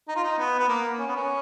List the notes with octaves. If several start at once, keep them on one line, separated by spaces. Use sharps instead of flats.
D#4
F4
D#4
B3
B3
A#3
C#4
B3
C#4